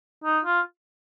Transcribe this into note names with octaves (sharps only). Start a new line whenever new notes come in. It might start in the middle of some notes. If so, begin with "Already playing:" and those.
D#4
F4